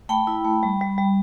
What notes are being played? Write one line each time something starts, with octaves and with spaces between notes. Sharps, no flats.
A3 G5 B5
E4
A3
G3
G3
G3